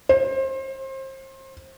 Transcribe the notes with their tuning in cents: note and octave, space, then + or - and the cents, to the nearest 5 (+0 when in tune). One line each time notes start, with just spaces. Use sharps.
C5 +30